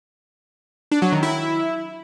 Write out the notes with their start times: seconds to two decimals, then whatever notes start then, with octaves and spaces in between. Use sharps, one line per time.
0.91 D4
1.02 F#3
1.12 D#3
1.23 E4